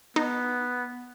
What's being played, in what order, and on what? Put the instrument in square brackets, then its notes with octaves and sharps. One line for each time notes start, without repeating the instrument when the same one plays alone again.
[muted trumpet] B3 [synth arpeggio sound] D#4